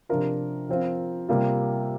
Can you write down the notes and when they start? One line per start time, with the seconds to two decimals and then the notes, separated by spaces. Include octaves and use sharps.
0.09 C3 F3 D4 F4 A#4
0.69 F3 C4 F4
1.29 C3 G3 A#3 F4